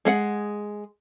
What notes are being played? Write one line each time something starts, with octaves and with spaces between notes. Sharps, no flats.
G#3 G#4 F#5